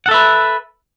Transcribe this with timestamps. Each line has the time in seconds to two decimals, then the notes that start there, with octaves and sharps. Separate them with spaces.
0.06 F#5
0.09 A4
0.11 E5
0.14 B4